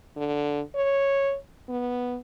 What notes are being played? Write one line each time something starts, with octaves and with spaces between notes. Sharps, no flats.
D3
C#5
B3